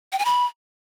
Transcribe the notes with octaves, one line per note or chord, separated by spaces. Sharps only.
G5
G#5
B5